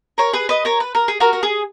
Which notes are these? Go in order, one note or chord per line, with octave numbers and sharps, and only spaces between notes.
A#4 C#5
G#4 B4
B4 D#5
A#4 C#5
B4
A#4
G#4
F#4 A#4
A#4
G#4